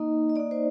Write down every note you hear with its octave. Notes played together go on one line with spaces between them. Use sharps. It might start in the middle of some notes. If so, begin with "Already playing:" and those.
Already playing: A#3 D#4 D#5
D#5
A#3 D#4 D5
C5